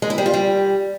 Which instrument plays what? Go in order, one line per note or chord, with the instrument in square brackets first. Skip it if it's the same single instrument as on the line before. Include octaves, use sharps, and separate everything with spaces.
[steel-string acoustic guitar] G#3
E4
G3
F4
G3